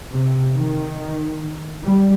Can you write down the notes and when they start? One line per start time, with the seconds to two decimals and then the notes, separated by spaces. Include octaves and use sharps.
0.12 C3
0.56 D#3
1.85 G3